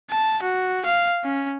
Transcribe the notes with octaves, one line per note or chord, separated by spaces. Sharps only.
A5
F#4
F5
C#4